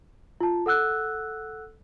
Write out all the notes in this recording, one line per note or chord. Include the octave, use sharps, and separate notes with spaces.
F4 A5
A4 F#5 E6 F#6